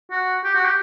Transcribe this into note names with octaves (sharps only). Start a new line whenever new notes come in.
F#4
G4
F#4
G4